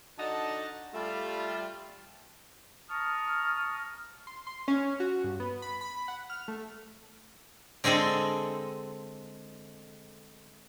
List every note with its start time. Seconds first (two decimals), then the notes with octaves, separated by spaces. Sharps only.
0.19 D3 D4 D#4 F#4 F#5 A5
0.93 G3 A3 F4
2.90 A5 A#5 C#6 D#6 F6
4.27 C6
4.47 C6
4.68 C#4
5.00 F#4
5.24 G2
5.40 B3
5.62 B5
5.81 B5
6.08 F#5
6.30 F6
6.48 A3
7.84 D3 G#3 C4 G#4 A4